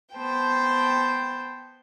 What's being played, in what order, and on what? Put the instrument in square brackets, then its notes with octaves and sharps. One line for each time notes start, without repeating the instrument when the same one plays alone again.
[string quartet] B3 C5 G5 A5